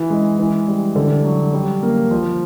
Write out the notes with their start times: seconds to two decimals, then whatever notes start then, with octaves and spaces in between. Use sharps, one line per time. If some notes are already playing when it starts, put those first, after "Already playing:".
Already playing: E3
0.10 G#3
0.39 E3
0.68 G3
0.96 D3
1.24 F#3
1.53 G3
1.83 A#3
2.11 F3